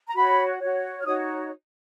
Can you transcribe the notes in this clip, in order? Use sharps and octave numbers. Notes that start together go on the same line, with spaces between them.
A#5
F#4 C#5 B5
F#4 C#5
F6
D#4 F#4 C#5 D#6